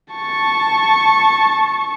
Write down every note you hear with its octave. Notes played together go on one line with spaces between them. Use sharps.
A5 C#6